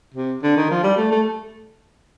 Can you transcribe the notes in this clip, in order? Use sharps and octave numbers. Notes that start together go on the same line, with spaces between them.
C3
D3
D#3
F3
G3
A3
A3